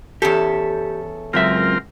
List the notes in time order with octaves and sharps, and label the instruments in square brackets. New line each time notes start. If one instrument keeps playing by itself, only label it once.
[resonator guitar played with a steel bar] E2 C#4 A4 [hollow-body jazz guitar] G4
[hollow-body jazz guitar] C#2 F#2 E5 [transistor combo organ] C4 F4 A#4